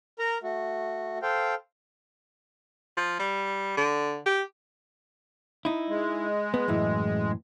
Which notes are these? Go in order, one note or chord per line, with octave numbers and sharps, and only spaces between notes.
A#4 A#5
A3 F#4
A4 C5 F5 G5
F3
G3
D3
G4
D#4 E4
G#3
B3
F#2 A2 E3